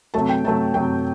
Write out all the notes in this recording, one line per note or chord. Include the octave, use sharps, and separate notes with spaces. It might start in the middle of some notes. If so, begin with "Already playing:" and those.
C3 F#3 A3 A5
G5
C3 F#3 A3 A5
C3 F#3 A3 G5